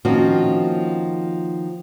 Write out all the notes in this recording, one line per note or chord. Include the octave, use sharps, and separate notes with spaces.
D#3 F3 A#3 C4 C#4 F#4